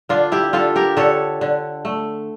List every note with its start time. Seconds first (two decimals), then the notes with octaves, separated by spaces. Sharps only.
0.09 D3 D4 F4
0.32 E4 G4
0.53 D3 F4 A4
0.76 G4 A#4
0.97 D3 A4 C#5
1.41 D3
1.85 A3